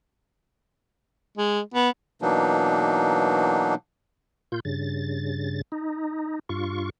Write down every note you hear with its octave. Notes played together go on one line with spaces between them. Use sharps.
G#3
B3
B2 E3 F#3 A#3 D4 D#4
A#2 F4 G6
G2 C#3 A6
D#4
G2 F4 C#6